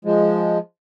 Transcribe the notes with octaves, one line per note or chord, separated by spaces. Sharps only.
F3 G#3